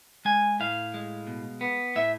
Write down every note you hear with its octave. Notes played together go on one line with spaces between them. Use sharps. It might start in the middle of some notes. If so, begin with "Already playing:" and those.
G#3 G#5
A2 F5
G#3
B2
B3
A2 E5